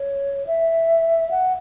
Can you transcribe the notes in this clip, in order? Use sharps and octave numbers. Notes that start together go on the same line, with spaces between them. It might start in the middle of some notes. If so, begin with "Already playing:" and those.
Already playing: C#5
E5
F#5